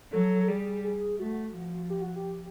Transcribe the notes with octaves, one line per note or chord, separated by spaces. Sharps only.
F#3 A4
A4
G3 G#4
G#4
A3 F#4
F3
G4
F#4
G4